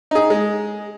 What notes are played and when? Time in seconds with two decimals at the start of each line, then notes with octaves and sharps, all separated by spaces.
0.11 D#4 G#4
0.30 G#3